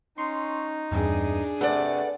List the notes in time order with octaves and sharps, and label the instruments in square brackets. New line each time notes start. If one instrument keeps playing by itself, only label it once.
[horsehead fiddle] C#4 [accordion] D#4 [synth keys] C6 C#6 C7
[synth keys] E2 G2 C3 [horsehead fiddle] D4 G#4
[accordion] C3 A3 [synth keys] A4 B4 [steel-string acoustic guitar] D5 F#5